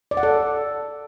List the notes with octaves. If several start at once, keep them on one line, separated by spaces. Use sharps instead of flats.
D5
F#5
A4